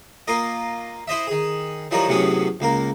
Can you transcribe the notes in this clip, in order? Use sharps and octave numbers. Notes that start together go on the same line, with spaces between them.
A#3 F4 A#4 D#5
E4 C5 D#5 E5
D#3 G#4
E3 F3 G3 D#4 A#4 C#5
A2 C3 F#3 B3 C#4 G#4
C#2 A#3 A#4